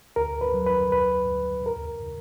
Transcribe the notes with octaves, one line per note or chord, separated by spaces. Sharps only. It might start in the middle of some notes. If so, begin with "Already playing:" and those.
D2 A#4
B4
F#3
B4
D2 B4
D2
D#2 A#4